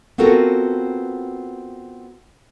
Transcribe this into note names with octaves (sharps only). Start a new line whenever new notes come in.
B3 C4 F4 F#4 A4 A#4